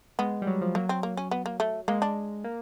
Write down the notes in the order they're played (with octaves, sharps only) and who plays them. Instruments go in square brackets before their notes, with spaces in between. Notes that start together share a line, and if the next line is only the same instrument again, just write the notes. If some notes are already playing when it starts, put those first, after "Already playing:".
[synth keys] G#3 [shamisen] B3
[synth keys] G3
F#3
F3
[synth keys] F#3 [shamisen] A#3
[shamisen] C4
A#3
C#4
B3
A#3
A3
[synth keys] G#3 [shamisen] A#3
[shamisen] D4
[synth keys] A#3